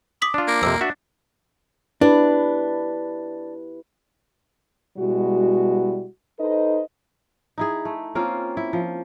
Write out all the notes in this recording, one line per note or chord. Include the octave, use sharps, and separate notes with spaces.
D6 D#6 B6 F#7
D4 F4
A#3 D6
F2 C3 E6
D4 F#4 E5
D4 E4 G4 B4
B2 G3 G#3 E4 F#4
D#4 A4 B4 C5 D#5
D#4 E4 G#4
A3
A#3 C4 C#4 F4
E4
F3